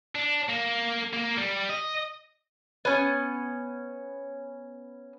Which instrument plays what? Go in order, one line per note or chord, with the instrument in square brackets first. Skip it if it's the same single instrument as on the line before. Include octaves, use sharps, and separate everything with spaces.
[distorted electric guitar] D4
A#3
A#3
G3
D#5
[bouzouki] B3 C#4